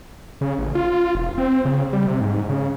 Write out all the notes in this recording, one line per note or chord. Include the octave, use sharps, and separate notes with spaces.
C#3
A1
F4
E1
C4
C#3
G3
C3
G#2
C#3